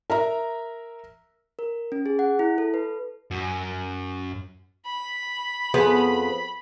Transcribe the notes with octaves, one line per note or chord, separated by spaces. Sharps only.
A#4 E5 A#5
A#4
C#4
G#4
F#5
E4
A4
B4
F#2
B5
F2 B3 G#4